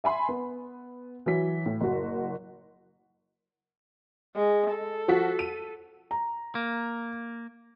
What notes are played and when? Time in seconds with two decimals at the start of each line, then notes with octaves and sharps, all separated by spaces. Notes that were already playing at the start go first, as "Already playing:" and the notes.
0.04 E5 G#5 B5 C6
0.29 B3
1.26 E3 F#3 B6
1.66 A2
1.81 F#1 F#4
4.35 G#3
4.72 A4
5.08 F3 F#4 B6
5.39 D#7
6.11 A#5
6.55 A#3